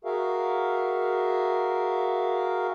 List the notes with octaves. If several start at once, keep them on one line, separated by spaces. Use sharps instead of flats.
F#4 G#4 A#4 E5 F5